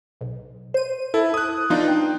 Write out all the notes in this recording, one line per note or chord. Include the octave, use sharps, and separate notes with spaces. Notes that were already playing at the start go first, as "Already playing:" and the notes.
B1
C5 D#7
E4 A4
D#6 F#6
F3 B3 D4 D#4 F4
G5